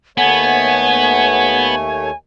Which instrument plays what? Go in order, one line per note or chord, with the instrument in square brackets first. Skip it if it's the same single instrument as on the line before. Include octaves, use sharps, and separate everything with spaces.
[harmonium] D#2 A3 C#5 [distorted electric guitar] B3 [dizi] F#5 [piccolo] G#5